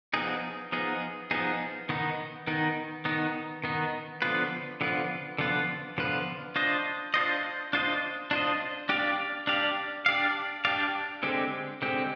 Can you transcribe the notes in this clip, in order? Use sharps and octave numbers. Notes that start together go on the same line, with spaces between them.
F3 B3 D#4 G#4
F3 B3 D#4 G#4
F3 B3 D#4 G#4
D#3 B3 D#4
D#3 B3 D#4
D#3 B3 D#4
D#3 B3 D#4
D3 F3 B3 F4 B4
D3 F3 B3 F4 B4
D3 F3 B3 F4 B4
D3 F3 B3 F4 B4
D4 F4 C5 D#5
D4 F4 C5 D#5
D4 F4 C5 D#5
D4 F4 C5 D#5
D4 G4 D5 F5
D4 G4 D5 F5
D4 G4 D5 F5
D4 G4 D5 F5
D3 G#3 C4 G4
D3 G#3 C4 G4